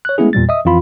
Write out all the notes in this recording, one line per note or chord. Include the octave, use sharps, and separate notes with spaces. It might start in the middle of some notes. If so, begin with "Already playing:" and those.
C#5 F#6
G#3 A3 B3 C#4 E4 G#4
E2 A#2 G3 A6
D#5 E5 D#6
F2 E3 F4 B5